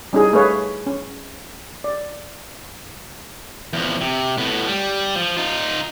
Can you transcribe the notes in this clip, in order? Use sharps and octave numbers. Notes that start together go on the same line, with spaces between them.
G3 C#4 D#4 E4 G#4
A3 G#4 B4 C#5 F5
C#4
D5
E2 F3
C3
A2 B3
G3
F3
D#4 F4